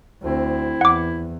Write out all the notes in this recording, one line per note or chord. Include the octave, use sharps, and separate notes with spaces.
D2 C4 E4
E2 F#5 D6